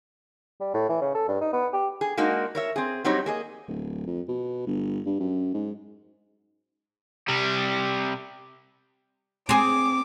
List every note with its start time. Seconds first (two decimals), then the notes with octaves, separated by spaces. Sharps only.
0.60 G3
0.74 A2
0.89 E3
1.01 C#3
1.15 A4
1.28 G2
1.41 D#4
1.53 B3
1.73 G4
2.01 G#4
2.17 G#3 A#3 D4 D#4 F#4
2.55 A#4 C#5 E5
2.76 C4 G#4
3.05 F#3 G3 C4 D#4 G4 C#5
3.26 A#3 G#4 D#5
3.68 D1
4.07 F2
4.28 B2
4.67 G1
5.06 G2
5.20 F#2
5.54 G#2
7.28 C3 G3
9.49 C4 G#4 D6